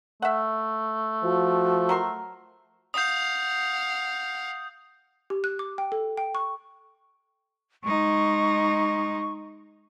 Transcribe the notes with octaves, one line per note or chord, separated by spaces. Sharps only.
A3 E5 F#5
F3 F#4
F#3 A#4 C6
F5 F#5 D#6 G6
G4
F#6
D6
G5
A4
G5
C#6
G#3 D#4 C#6